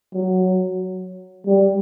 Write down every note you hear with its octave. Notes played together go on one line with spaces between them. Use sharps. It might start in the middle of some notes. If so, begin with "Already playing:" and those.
F#3
G3